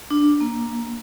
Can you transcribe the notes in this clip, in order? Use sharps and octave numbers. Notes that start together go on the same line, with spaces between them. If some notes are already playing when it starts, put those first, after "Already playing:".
D4
A#3